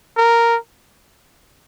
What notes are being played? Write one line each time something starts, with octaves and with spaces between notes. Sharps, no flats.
A#4